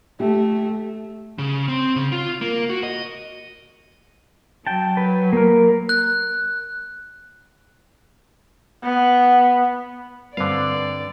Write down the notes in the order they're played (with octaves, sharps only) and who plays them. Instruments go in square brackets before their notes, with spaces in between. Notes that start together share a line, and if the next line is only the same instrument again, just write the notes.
[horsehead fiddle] A3 [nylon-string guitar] G4
[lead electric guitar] C#3
C4
C#3
F4
A#3
F#4
D#5
[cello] F#3 [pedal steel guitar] G5 A5
[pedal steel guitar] B4
A#3 A#4
[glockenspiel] F#6
[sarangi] B3
[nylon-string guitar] G2 C4 B4 [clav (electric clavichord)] D3 F5 [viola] D5